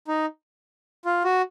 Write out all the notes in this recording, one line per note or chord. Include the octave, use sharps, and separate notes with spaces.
D#4
F4
F#4